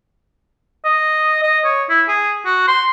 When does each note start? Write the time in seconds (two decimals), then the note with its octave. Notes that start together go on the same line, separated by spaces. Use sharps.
0.85 D#5
1.43 D#5
1.65 C#5
1.89 E4
2.08 G#4
2.46 F#4
2.68 C6